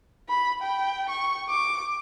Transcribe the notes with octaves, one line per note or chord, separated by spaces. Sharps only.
B5
G5
C#6
D6